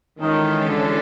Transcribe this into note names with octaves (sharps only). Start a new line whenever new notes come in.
D#3 E3 G#3 C#4 F4 A4
D3